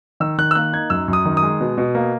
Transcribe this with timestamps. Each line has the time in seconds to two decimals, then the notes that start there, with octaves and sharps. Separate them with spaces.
0.20 D#3 E6
0.38 D#3 F#6
0.51 E6
0.55 A#3 F#6
0.73 D#4 G#6
0.90 F#2 E6
1.08 F#2
1.13 D#6
1.25 D#3
1.37 D#6
1.43 G#3
1.60 B2
1.77 B2
1.95 A#3